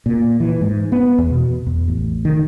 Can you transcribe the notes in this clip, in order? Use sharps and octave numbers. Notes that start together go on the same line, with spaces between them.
A#2
E3
G#2
B3
E2
B2
E2
A1
D#3